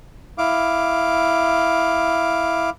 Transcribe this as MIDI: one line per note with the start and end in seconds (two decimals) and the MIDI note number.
0.38 2.70 64
0.38 2.70 77
0.38 2.70 86